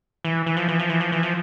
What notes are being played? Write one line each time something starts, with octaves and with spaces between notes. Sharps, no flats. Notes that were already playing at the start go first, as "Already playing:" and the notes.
E3
E3
F3
E3
F3
E3
F3
E3
F3